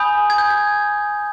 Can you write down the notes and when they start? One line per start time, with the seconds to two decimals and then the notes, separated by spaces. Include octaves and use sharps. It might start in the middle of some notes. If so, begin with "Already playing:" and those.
Already playing: G#5 B5 D#6 G6
0.30 G#6
0.38 G6
0.51 G#6